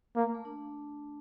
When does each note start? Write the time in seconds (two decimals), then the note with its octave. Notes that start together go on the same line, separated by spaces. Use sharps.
0.16 A#3
0.34 A3
0.45 D4